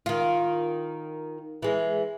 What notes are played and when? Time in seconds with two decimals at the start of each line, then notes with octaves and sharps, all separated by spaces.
0.06 D#3 F4
1.62 E3 G#3